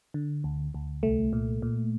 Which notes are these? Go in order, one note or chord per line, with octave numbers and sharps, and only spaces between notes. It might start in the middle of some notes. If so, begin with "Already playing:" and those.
D3
D2
D2
C2 A3
A#2
A#2